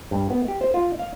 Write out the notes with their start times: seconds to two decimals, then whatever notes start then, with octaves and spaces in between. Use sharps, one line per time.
0.11 G2
0.30 B3
0.48 G4
0.61 C5
0.74 F4
0.99 F5